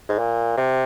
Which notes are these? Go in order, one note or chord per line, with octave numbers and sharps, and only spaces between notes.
G#2
A#2
C3